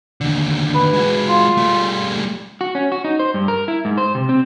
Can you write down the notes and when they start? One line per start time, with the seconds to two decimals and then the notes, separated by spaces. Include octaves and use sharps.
0.21 D#2 D3
0.75 B4
0.93 G#3 F#4
1.29 F4
1.57 G3 A3
2.61 F#4
2.75 C#4
2.92 F#4
3.05 D#4
3.19 C5
3.34 G2
3.48 A#4
3.68 E4
3.85 G#2
3.97 C5
4.15 C3
4.29 C4